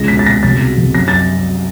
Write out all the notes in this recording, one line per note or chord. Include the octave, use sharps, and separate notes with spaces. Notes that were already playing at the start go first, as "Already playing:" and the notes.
Already playing: C#2 A#6
B2 B6
A6
B2 A#6
C2 A6
B2
C2
F#2 A#6
A6